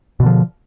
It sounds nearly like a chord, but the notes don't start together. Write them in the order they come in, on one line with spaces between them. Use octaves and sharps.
B2 D3 F3